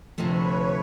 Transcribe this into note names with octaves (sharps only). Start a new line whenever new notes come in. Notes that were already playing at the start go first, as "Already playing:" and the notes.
D2 C3 F3 A3 B4 C#5